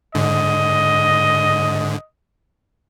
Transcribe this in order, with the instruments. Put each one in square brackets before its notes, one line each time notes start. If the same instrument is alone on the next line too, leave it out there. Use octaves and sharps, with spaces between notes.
[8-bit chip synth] G#2 D3 [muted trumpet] D#5